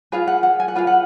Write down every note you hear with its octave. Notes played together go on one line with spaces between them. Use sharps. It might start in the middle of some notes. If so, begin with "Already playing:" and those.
F4 G#4 B4 F5
F#5
F#5
G#5
F#5
F4 G#4 B4 F5
F#5